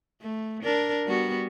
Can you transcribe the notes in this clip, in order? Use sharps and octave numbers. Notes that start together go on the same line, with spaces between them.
A3
D4 A#4
G3 B3 F#4